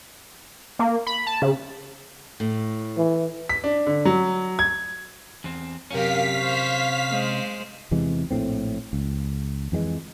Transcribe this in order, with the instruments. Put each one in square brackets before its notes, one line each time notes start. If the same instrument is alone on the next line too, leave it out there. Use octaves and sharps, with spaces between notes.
[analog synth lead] A#3
B5
A5
C#3
[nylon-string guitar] A2
[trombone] E3
[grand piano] B6
D4
D3
F#3
G#6
[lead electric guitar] E2 C4
[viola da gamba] F#2 G4 A#4 [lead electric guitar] C3 C#4 [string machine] F5 B6
[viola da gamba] C5 C#5
G#3 C5
[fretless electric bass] E2 C3 E3 G#3
A#1 A2 C4
C#2
F2 E3 G3 G#3